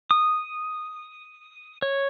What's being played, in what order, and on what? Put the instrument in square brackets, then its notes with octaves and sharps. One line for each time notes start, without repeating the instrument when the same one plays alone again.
[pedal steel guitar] D#6
C#5